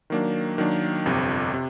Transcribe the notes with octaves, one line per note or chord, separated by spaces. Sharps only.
D#3 F#3 A#3 D4
D#3 F#3 A#3 D4
G1 F2 C3
C3